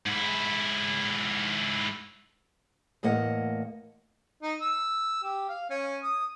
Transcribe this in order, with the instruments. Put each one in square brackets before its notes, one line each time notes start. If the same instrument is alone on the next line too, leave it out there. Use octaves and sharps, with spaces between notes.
[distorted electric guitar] G#2 E4
[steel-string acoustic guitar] E2 A2 A#3 D#5 F#5
[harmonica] D#4
E6
G4
F5
C#4
D#6